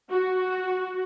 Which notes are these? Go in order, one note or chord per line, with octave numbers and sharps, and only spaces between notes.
F#4